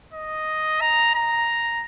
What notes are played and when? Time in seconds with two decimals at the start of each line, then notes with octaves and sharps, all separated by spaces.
0.13 D#5
0.81 A#5
1.15 A#5